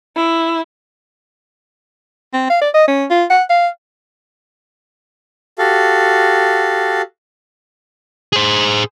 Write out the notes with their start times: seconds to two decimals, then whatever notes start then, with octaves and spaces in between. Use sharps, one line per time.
0.16 E4
2.34 C4
2.50 F5
2.62 D5
2.74 D#5
2.88 C#4
3.11 F4
3.30 F#5
3.50 F5
5.59 F#4 G4 A4 F5
8.33 G#4 C5